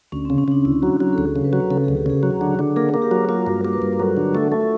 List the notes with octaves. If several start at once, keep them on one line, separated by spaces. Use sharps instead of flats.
D2 C#4
C#3 C4
C#4
C#3 D4
D2 E4
F#3 F#4
F#3
A4
D2 G#4
C#3
B4
F#3
C#3 A4
D2 G#4
G4
C#3 G#4
F#3
D3
D3
A#3 G#4
A#3 G#4
G4
F#3 F#4
A#3 F4
G2 F#4
A#3 G4
B4
G2 A#4
A#4
F#3 A4
D3 G4
A3 F#4
A3
F4